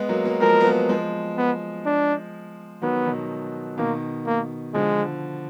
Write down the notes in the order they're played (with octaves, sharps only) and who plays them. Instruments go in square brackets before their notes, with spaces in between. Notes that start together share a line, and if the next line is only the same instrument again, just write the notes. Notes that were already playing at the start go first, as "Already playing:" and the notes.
Already playing: [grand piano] G#3 B3
F#3 A#3
F#3 A#3
[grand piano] F3 G#3 [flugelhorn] A#4
[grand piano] B3
F#3 A#3
F3 G#3
[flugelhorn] B3
D4
[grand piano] D#3 F#3 [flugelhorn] B3
[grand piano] B2 D#3
[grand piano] B2 D#3 [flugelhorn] A#3
[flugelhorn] A#3
[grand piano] D3 F3 [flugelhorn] G#3